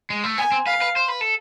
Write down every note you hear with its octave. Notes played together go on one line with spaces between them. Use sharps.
G#3
A3
B3 G#5
C4
B4 F5
B4
C5
B4
A4